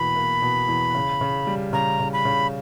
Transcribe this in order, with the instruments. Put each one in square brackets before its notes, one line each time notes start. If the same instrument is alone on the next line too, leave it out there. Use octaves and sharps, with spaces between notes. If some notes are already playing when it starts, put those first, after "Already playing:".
Already playing: [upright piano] E2 B2 A#3 [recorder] B5
[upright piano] A#3
B2
E2
C#3
C#3
G3
[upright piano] C#3 [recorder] A#5
[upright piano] C#3
[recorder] B5
[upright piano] C#3